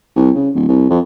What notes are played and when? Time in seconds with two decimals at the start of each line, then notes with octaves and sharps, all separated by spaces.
0.16 C2
0.35 C#3
0.55 D1
0.68 C2
0.90 F2